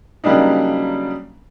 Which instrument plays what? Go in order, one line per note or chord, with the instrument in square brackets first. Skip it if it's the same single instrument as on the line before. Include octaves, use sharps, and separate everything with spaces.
[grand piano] C#3 F#3 G3 A#3 D4 D#4